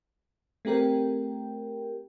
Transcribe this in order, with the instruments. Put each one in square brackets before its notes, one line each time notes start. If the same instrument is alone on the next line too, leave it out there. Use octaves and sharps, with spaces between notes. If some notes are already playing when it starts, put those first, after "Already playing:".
[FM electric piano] A3 C4 G4 A#4 G5